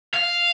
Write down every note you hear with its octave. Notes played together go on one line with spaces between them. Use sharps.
F5